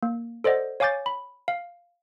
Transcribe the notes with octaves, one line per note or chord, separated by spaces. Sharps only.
A#3
A4 C5 D5 D#5 F#5
C#5 F5 G#5 D6 G6 A6
B5
F5